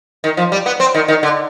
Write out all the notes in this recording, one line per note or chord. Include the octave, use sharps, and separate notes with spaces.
D#3
F3
G3
B3
C4
D#3
D#3
D3